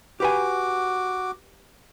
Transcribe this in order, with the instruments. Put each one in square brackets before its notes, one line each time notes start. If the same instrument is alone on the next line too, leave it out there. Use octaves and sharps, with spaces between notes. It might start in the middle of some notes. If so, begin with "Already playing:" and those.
[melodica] F#4 D6 [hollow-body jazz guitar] G4 B4 G#5